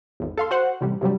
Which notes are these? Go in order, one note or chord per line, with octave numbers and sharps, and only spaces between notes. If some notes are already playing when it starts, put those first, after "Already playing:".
G#1 E2
A4 F5 C6
F#4 C5 F#5
A1 C3 G3
G2 C3 F#3 G3